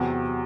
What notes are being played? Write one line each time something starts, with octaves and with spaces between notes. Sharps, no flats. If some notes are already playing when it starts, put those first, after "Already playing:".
Already playing: E2 C3 F#3 C4